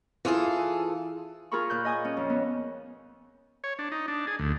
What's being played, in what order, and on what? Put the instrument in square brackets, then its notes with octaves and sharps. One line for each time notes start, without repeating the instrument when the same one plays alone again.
[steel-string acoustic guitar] E3 F4 G#4 A4
[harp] F4 G#4 A#4 A#5 B5 C#6
A#2 F#6 G6
D#5 G#5 D#6
C#4
F2
B3
[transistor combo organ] C#5
D4
D#4
D4
G#4
D2